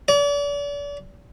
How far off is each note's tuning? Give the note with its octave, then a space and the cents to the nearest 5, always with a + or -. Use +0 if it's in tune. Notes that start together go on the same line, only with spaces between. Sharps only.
D5 -40